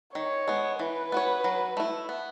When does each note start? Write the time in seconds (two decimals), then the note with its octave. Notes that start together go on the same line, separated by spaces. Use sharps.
0.14 D#3 C#5
0.48 G#3 B3
0.79 E3 B4
1.12 B3 F#4 C#5
1.44 F#3
1.77 A3 E4
2.09 B3